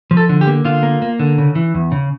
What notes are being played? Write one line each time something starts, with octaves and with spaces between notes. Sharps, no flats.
F3
A4
D3
G4
A#3
D3 F4
A#3
A#3
D3
C#3
E3
E2
C#3